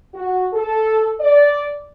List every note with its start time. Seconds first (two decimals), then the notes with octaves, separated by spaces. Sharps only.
0.14 F#4
0.53 A4
1.20 D5